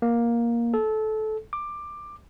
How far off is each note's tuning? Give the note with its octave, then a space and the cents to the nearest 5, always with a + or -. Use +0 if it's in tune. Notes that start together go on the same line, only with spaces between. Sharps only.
A#3 +10
A4 -20
D6 +15